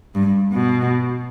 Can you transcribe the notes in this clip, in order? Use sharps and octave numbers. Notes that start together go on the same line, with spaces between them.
G2
B2